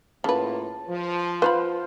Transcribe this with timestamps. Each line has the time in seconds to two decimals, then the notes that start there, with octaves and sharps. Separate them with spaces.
0.24 A2 C#3 A#3 F4 B4 A5
0.89 F3
1.42 F4 B4 C5 F5 B5